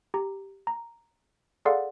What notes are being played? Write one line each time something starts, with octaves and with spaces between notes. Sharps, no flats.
G4 A#5
A#5
G#4 A4 D5 F5 F#5 C6